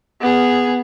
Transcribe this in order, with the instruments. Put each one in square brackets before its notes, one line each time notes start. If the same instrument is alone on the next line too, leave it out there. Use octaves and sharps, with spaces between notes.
[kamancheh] B3 G#4